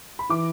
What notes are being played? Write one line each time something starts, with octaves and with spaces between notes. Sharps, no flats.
B5
E3 D6